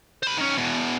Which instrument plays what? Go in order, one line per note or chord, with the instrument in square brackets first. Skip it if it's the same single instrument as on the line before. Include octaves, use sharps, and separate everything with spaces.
[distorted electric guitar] C5 B5
D#3 C#4
E2 B2